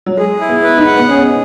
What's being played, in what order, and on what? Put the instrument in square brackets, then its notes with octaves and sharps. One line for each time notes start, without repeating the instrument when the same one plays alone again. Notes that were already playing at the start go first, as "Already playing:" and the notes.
[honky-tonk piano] F#3
[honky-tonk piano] G#3 [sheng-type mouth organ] G#4
[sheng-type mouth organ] E4
[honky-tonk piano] B3
[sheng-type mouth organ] B4
[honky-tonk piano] D#4
[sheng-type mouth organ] F#5
[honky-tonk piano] B3
[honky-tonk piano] C#4 [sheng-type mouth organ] G#4